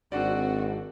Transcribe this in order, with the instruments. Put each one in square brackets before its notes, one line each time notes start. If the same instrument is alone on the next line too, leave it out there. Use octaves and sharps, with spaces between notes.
[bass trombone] G#1 [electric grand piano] C4 D4 D5 [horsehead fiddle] F#4